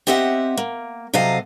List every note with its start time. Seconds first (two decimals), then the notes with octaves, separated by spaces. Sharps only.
0.07 C4 G4 D#5 E5 F#5
0.57 A#3
1.14 C3 F#3 A4 D#5 F5